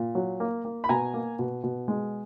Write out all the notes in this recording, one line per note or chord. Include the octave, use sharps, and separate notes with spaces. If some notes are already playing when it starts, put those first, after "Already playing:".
Already playing: A#2
F#3
A#3
A#3
B5
B2 G#5 A#5
A#3
B2
B2
G#3